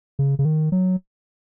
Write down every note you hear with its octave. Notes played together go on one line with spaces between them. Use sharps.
C#3
C#3
D#3
F#3